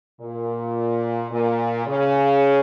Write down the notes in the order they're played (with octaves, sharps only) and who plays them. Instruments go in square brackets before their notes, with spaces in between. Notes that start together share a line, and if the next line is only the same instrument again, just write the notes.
[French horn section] A#2
A#2
C#3